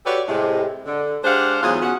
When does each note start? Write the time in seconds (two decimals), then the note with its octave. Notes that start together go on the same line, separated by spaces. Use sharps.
0.05 F#4 G4 A4 B4 C#5 D5
0.28 A2 C3 G#3
0.86 D3
1.24 G#3 D4 G4 C5 F5 F#5
1.63 E2 G#2 F#3 F4 G#4
1.82 B2 C#4 F#4 G#4 F#5